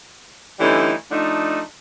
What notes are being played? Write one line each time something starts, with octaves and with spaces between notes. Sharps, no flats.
D3 E3 G3 A3 C#4 D#4
F3 A3 D4 D#4